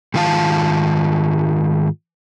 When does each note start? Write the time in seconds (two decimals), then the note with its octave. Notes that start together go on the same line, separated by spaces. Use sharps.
0.14 G#2 D#3 F4 F5 A5